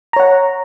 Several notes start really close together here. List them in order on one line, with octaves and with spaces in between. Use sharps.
A#5 C#5 F#5